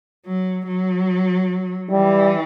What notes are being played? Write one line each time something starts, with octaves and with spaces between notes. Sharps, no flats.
F#3
F#3
E3 G3